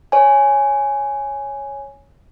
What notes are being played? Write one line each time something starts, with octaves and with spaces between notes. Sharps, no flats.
C#5 G#5